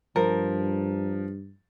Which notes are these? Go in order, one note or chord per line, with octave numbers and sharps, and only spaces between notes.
G2 F3 A#4